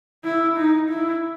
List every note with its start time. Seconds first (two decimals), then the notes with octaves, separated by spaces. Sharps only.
0.25 E4
0.57 D#4
0.89 E4